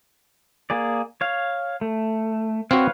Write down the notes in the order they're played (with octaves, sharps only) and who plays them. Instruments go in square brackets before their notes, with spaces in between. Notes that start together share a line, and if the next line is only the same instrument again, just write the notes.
[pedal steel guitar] A#3 G#4 D5
C#5 F5
A3
[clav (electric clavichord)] C4 F#4 [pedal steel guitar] B4 C#5 F5